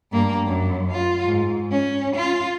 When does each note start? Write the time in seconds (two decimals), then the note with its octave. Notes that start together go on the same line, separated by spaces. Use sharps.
0.12 G2 A#3
0.47 F#2
0.91 F4
1.25 G#2
1.72 C#4
2.16 F4